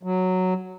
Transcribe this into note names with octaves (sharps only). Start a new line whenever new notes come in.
F#3